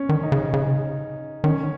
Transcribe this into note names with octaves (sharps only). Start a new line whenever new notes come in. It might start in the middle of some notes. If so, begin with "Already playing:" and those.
Already playing: C#4
D#3
D#4
C#3
C#3
D#3 C#4